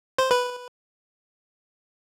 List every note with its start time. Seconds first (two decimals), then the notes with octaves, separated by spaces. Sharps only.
0.18 C5
0.31 B4